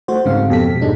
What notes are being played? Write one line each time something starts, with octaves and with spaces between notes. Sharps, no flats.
A3 F#4 C5
G#2 C#3 C4 F5
F2 B2 G4 A4 B6
G#2 B2 G#3 D4 D#4